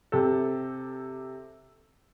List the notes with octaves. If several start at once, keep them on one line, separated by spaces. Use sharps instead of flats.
C3 G4 A4